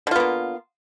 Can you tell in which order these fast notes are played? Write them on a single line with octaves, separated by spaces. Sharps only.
D3 F4 B3 A#3